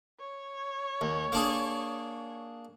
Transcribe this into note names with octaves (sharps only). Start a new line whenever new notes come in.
C#5
D#2
A#3 D4 G#4